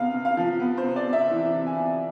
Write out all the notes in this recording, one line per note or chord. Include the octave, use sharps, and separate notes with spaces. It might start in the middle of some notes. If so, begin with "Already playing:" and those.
Already playing: C3 B3 F5
C3
F5
F3
B3
C5
C3
D5
C3
E5
E3
C3
G#5
C3